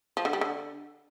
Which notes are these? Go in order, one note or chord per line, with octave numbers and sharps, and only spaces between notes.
F3
D3
G3
D3